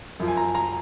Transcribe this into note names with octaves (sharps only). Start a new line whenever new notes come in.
F#2 F3
G#5
A#5
A#5